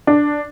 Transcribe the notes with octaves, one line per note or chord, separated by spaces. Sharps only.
D4